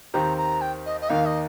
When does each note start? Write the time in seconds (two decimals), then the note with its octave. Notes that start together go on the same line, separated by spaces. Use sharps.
0.14 D#2 D#3 C4 G4 A#5
0.38 A#5
0.61 G5
0.86 D#5
1.01 D#5
1.09 D#2 D#3 A#3 D#4 F5
1.26 D#5